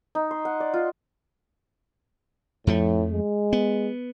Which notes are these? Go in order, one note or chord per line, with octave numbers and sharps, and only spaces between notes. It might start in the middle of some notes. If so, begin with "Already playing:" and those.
D#4
C6
F#5
D5
F4
F2 A2 F3 A3
G#3
B3